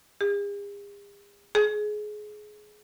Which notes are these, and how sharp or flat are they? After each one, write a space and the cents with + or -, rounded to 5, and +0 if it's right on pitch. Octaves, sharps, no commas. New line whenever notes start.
G#4 -45
G#4 +20